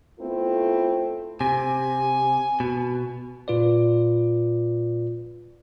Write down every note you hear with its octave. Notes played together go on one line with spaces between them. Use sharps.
A3 B3 C4 E4 F4 A4
C3 G#5
B2
A#2 F4 B4 D5